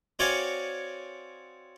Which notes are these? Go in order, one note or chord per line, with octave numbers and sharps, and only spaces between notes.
C4 F#4 C#5 D5 F5 G#5